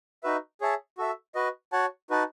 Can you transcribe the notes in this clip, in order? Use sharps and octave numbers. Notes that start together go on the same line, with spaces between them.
D#4 F#4 B4 E5
G#4 C#5 E5 A5
F#4 A4 E5
F#4 B4 D#5
F#4 C#5 F#5 A5
D#4 F#4 B4 F#5 A5